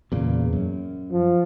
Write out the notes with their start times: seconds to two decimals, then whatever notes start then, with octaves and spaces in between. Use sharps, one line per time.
0.12 E2 A#2 C#3
0.53 F#2
1.11 F3